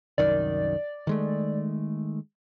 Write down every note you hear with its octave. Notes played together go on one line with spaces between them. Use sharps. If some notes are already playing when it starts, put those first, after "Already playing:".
C2 F#2 D#3 D5
D#3 G#3 A3